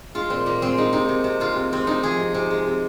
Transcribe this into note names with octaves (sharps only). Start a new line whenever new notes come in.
G#3 F4
A#2 C4
A#2 A#3
G#3 C4
G#3 D#4
C3 D#4
C3
C3
G#3 F4
C3
C3 C4
C3 D#4
F3 G#4
C3
C3
G#3
C3